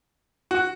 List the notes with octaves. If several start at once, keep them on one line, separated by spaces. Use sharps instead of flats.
F#4